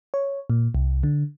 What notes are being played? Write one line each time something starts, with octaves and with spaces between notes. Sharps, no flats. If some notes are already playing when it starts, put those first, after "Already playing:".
C#5
A#2
C2
D3